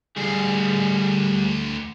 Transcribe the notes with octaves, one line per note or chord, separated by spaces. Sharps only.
D2 G3 G#4 F5